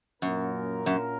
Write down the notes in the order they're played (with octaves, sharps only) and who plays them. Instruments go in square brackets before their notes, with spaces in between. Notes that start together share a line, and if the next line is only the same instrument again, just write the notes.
[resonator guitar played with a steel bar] F#2 [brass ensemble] A#2 A#3 C#4 A#4
[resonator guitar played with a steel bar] F#2